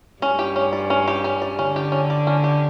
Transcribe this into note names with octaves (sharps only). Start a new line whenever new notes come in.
G2 C#4
G4
C#4
D5
C#4
G4
C#4
D5
D3 C#4
G4
C#4
D5
C#4
G4